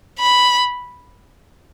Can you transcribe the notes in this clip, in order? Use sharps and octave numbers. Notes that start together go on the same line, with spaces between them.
B5